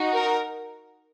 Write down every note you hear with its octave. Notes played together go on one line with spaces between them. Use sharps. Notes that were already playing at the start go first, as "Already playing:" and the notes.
Already playing: D#4 F#4
A#4